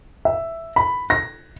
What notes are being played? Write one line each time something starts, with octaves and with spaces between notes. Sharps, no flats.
E5
B5
A#6